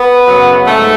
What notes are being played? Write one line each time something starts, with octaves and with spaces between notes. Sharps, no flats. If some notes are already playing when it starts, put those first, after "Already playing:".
Already playing: B3
F#2 C#3 F#3
G#2 A3